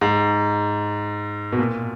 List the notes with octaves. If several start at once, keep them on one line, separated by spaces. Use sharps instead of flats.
G#2
B2
A#2